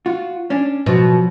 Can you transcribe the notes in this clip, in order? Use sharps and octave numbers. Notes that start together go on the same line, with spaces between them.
F4 F#4
C#4 D4
B2 F3 F#3